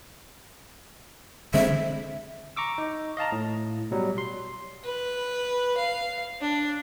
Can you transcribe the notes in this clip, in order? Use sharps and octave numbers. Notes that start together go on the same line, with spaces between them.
D3 G#3 C4 E5
A#5 C#6 D6 E6
D#4
D#5 F5 A5 A#5
A2
B2 F#3 G3
C6
B4
F5
D4